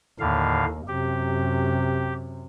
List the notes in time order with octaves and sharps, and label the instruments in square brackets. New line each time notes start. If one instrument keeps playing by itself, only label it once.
[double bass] D#2 [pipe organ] A2 D3 F5
[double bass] F#2 C3 [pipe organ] G4